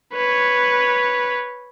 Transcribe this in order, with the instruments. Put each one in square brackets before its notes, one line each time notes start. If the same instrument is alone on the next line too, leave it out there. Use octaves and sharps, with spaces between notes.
[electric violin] B4 C#5